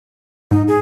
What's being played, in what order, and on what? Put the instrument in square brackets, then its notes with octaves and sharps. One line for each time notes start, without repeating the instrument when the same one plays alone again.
[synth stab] G#2 [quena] D#4
[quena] G#4